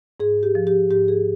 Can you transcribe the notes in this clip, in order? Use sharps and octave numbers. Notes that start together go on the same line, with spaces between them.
G#2 G#4
G4
F3
G4
G#2 G4
G#4